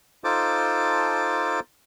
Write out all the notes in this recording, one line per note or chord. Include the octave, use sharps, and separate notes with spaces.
D#4 F4 A4 C5 A5 D6